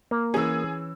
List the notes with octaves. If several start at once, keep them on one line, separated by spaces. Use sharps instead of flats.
A#3
E3 C#4 G#4 E6